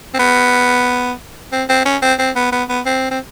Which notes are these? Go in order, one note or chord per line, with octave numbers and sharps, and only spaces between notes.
C4
B3
C4
C4
C#4
C4
C4
B3
B3
B3
C4
C4